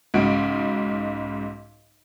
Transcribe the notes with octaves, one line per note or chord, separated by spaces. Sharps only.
B1 G#2 C#3 F#4 D7